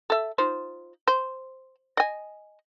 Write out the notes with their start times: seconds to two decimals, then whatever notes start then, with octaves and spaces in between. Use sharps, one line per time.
0.10 A4 E5
0.38 D#4 F4 C5
1.08 C5
1.97 D#5 G#5